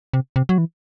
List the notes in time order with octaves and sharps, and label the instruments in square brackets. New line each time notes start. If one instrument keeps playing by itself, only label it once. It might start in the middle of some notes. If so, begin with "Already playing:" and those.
[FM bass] C3
C3
F#3
E3